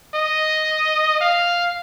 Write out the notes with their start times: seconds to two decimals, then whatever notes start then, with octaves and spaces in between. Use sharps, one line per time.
0.15 D#5
1.21 F5